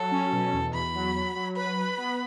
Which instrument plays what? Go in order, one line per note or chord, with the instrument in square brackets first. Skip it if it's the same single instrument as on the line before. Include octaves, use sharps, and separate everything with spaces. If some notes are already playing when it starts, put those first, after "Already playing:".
Already playing: [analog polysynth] F#3 [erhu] A4
[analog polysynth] C#4
B2
E2
[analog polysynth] E2 [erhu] B5
[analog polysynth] F#3
F#3
F#3
[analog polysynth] B4 [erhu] B5
[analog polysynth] B4
B3